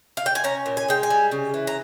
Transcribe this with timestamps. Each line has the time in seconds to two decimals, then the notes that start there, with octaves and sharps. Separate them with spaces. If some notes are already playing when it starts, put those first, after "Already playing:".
0.17 F5
0.26 G5
0.35 G#5
0.44 C#4 A#5
0.66 A#2
0.77 G#5
0.88 G#3 G5
1.03 G#5
1.10 G3
1.31 C#3
1.54 E3
1.67 A#5